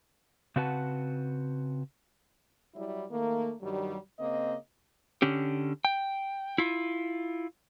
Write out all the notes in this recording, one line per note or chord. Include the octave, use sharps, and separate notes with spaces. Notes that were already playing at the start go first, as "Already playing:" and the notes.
C#3 C4 F#4 B4 F#5 A5
F#3 G3 E4
D#3 A3 A#3
G2 D#3 F#3 G3
C#3 A#3 C4 D#5
D3 C#4 G4
G5
E4 F4